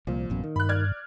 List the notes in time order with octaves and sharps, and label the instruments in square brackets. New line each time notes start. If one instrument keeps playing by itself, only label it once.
[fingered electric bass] C2 F3 [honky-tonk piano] A#2
[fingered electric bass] A1 F#2 B2
D#3
[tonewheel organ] G2 [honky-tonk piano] B5 F#6
[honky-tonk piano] D5 F6 G#6